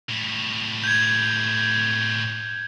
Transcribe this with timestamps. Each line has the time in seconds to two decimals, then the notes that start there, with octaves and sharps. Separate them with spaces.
0.09 A2 G3
0.84 G6 G#6